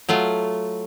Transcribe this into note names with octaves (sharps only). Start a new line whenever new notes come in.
F#3 A3 F4